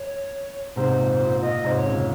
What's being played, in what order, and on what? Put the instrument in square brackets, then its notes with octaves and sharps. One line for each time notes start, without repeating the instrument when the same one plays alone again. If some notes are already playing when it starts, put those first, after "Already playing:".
Already playing: [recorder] C#5
[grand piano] G#2 C3 [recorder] C5
[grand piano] A#2
A#2
[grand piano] A#2 [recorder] D#5
[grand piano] G#2 C3 [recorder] C5
[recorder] C#5
[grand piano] A#2 C#3